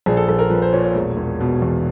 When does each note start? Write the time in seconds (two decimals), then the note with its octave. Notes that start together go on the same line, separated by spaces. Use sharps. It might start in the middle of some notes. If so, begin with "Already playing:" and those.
0.06 A#1 G#4
0.17 A4
0.28 A#1 A4
0.39 A#4
0.50 F3 B4
0.62 C5
0.73 A#2 C#5
0.84 C#5
0.95 E1
1.17 E1
1.40 B2
1.62 E2